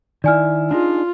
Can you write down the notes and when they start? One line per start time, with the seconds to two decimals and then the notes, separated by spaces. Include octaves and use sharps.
0.24 D#3 E4 D5 G#5 F6
0.71 D4 D#4 F4 G#4